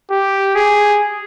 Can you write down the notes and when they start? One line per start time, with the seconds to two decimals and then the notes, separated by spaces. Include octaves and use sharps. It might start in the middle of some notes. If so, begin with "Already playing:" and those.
0.11 G4
0.55 G#4